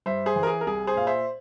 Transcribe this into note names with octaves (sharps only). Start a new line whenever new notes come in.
G2 C5 E5
G#4 C5
E3
A#4
G#4
A#4
C2 G#4
G#4 C5
A#2 F5
C5 E5